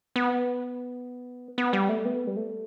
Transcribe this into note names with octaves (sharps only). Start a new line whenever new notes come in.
B3
B3
G3
A3
B3
G3
A3